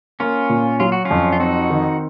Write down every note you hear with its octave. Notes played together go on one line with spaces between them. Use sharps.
A#3 C#4 F4
A#2
F#3 F4
F#4
C#4 F4
F2
F4
C4 D#4 F#4
D#3